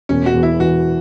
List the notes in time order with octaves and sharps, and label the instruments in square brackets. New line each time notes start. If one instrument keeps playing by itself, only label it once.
[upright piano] E1 [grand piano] C#4
[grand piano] F#4
[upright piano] E2
[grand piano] E4
[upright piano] E3 [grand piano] F#4